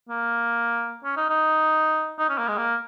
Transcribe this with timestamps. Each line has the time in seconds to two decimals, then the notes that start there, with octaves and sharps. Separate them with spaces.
0.09 A#3
1.04 C#4
1.17 D#4
1.30 D#4
2.19 D#4
2.29 C#4
2.38 A#3
2.48 G#3
2.58 A#3